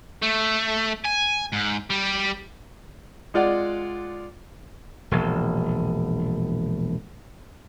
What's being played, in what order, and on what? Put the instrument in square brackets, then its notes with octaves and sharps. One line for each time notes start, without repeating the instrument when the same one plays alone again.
[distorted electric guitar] A3
G#5
G#2
G3
[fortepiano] G#3 F4 D5 F#5
[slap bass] E1 A#1